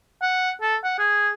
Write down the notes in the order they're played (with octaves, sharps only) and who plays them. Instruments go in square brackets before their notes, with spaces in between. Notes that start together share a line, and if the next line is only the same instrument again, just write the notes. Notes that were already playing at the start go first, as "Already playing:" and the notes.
[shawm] F#5
A4
F#5
G#4